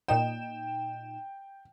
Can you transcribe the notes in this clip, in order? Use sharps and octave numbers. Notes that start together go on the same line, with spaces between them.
A#2 D#4 G5 E7